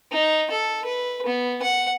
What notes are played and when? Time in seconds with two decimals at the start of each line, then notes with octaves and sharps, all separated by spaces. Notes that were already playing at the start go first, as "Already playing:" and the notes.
0.12 D#4
0.51 A4
0.85 B4
1.26 B3
1.62 F#5